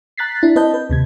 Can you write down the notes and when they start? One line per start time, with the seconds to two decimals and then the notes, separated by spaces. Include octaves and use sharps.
0.18 A#5 F#6 A6 B6 C7
0.43 D4 E4
0.56 C4 B4 D#5 A5 G6
0.74 B4
0.90 D#2 C3 G#6